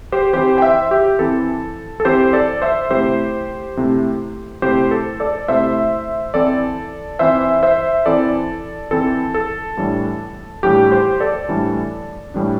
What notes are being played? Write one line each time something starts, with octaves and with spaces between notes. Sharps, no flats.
G4 C5
E3 C4 E4 G4 C5
G5
C5 E5
G4
E3 C4 E4 A4
A4
E3 C4 E4 G4 C5
A4 D5
C5 E5
C3 A3 E4 G4 C5
C3 A3 E4
C3 A3 E4 G4 C5
A4
A4 D5
C3 A3 E4 C5 E5
E3 C4 E4 A4 D5
E3 C4 E4 C5 E5
C5 E5
E3 C4 E4 A4 D5
E3 C4 E4 A4
A4
A2 E3 G3 D4
A2 E3 G3 D4 G4
G4 C5
A4 D5
A2 E3 G3 D4
A2 E3 G3 D4